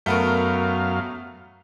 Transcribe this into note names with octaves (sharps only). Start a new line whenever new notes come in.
F#2 A3 B3 A#4 F5